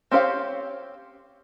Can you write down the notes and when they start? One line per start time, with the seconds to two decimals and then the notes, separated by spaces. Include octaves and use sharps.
0.11 C4 C#4 G4 C5 F5